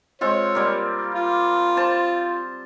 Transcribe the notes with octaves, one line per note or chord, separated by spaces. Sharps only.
G#3 C4 F4 C#5
G3 A#3
F4
C5 A5